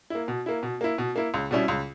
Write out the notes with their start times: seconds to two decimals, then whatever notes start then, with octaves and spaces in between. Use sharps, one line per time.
0.10 A#3 E4
0.28 B2
0.46 A#3 E4
0.63 B2
0.81 A#3 E4
0.98 B2
1.16 A#3 E4
1.34 C#2
1.51 B2 G3 C#4 E4
1.68 C#2